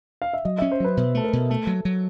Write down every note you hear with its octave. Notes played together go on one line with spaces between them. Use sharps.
F5
E5
F#3 D#5
C#4 E5
C5
F#3 B4
B2 B4
A3 A4
A#4
B2
A3 A4
F#3
F#3